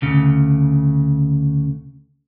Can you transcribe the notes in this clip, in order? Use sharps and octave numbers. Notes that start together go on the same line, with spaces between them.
D2 C#3